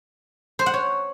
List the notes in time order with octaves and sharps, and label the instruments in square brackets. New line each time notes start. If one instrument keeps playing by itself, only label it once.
[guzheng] C5
F#5
C#5